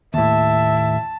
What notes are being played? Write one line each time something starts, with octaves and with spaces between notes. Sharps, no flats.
D#2 A2 E5 A5